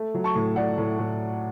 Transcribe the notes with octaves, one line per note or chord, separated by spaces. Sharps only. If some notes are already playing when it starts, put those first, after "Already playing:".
Already playing: A3
F#3
A5 C#6
A2
A2 D5 F#5
A2
A2